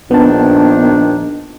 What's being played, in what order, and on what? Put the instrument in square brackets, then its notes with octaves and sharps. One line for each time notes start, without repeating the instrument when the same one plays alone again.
[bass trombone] A#1 [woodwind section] D#3 D4 [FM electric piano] B3 A5